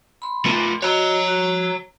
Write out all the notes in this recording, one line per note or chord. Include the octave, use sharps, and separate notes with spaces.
B5 C6
A3 F4
F#4 C#5 D#5 A#5
F#4